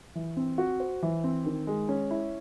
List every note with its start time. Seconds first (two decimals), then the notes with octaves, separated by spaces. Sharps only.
0.15 E3
0.37 C4
0.58 F#4
0.80 C5
1.03 E3
1.24 C4
1.46 D#3
1.67 G#3
1.89 C#4
2.11 E4